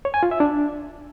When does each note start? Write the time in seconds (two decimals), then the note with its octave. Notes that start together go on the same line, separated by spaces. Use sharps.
0.05 C#5
0.14 G#5
0.23 F4
0.31 E5
0.40 D4